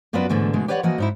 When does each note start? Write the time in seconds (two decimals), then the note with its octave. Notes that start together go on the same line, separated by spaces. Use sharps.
0.13 F#2 B3 F4 F#4 B4 D5
0.29 G#2 B2 D3 E3 A3
0.53 B2 D3 G#3 A3
0.68 G4 B4 C#5 D5 E5 F#5
0.83 E3 F3 A#3 F#4 D#5 F#5
0.98 G#2 D#4 E4